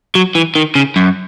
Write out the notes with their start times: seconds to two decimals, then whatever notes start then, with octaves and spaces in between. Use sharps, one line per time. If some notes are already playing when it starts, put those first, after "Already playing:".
0.15 F#3
0.35 E3
0.55 D#3
0.75 C#3
0.96 F#2